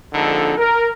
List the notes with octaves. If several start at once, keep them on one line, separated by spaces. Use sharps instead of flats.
A#1 F2 D3 D#4 A4
A#4